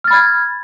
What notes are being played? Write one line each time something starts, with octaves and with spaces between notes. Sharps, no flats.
B5 F6 G#6 A6